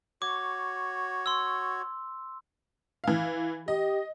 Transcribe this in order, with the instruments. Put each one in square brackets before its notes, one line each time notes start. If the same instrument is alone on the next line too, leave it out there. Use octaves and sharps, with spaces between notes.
[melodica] F#4 C#5 [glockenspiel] D6
[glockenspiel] C6 E6
[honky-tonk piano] E3 F5
[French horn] G4 [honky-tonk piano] D#5